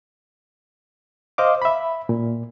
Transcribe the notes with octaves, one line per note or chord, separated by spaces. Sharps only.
C5 D#5 F5 D6
E5 B5
A#2